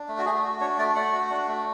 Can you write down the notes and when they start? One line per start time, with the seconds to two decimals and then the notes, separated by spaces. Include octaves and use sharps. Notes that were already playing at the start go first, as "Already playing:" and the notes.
Already playing: D4
0.08 A3
0.18 F#4
0.26 A3 G#4
0.43 F#4
0.61 D4 C#5
0.78 A3 D5
0.95 A3 F#5
1.12 F#4
1.30 D4
1.48 A3